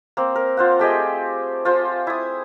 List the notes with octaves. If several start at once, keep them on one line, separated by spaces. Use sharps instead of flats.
A#3 C4
A#4
F4 C5 F#5
A3 G4 G#4 D#5
F4 C5
E4 D#6